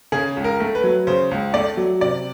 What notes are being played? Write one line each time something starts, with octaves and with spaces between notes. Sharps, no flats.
C#3 G#4
C#2
A#4
A3
B4
F#3
C#3 C5
C#2
A3 D5
F#3
C3 D5